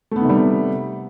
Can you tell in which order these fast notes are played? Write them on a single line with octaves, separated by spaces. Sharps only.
A3 B3 D#3 C3 G3